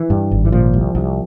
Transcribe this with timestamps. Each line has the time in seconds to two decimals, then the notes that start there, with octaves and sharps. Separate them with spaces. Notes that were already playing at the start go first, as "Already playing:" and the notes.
Already playing: E3
0.10 G2
0.31 G#1
0.45 E3
0.52 A#2 F3
0.74 C2
0.95 C2